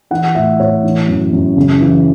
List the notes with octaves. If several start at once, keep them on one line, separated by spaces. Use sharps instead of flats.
E3 F#5
A2 E5
A2 C#5
E3
F#2
F#2
C#3
E3